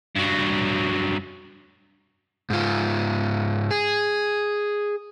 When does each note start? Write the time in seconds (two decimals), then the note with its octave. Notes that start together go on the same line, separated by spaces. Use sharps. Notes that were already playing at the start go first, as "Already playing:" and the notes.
0.16 G2 F#3
2.50 G#2 F4
3.71 G#4